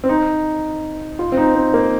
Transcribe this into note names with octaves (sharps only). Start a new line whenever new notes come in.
C4
D#4
F4
C4
D#4
C4
A#3